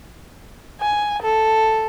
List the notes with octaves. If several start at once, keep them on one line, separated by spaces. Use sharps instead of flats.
G#5
A4